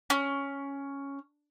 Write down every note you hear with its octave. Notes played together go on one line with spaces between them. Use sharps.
C#4